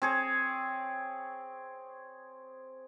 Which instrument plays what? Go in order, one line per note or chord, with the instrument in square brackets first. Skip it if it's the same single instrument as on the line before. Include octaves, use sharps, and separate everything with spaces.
[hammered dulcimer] C4 G#4 C#5